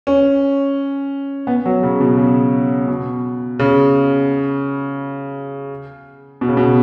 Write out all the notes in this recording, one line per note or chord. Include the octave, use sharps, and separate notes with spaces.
C#4
B3
F#3
C#3
B2
C#3
B2
C#3
B2
C#3
B2